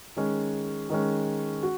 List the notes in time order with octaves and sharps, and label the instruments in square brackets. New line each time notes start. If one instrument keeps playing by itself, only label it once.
[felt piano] D#3 G#3 C#4
D#3 G#3 C#4
F#4